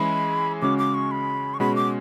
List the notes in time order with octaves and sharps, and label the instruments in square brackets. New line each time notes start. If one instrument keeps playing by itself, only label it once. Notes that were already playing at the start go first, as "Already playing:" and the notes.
Already playing: [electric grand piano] E3 G#3 C#4 E4 [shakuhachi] B5
[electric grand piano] C#3 G#3 C#4 F#4 [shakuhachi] D6
[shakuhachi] D6
C#6
B5
C#6
[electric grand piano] B2 G#3 C#4 F#4 [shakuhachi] B5
[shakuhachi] D6